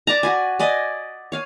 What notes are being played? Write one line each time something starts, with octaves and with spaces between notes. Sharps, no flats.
B4 D5 A5 A#5
F#4 B4 G#5
B4 D5 D#5 G#5
C#5 F5 G#5